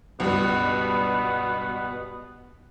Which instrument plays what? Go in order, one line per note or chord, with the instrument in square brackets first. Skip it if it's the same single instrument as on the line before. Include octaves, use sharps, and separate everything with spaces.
[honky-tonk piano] C#2 G2 G3 [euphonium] B2 [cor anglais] B3